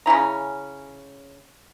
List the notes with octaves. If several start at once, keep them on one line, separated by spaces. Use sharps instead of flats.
C#3 C#4 E4 A#5